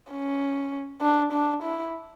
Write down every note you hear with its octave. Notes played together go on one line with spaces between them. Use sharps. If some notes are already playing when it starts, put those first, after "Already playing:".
C#4
D4
D4
E4